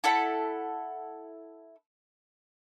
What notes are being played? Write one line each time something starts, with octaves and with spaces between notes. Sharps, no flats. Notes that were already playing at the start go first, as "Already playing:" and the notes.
E4 A4 F#5 B5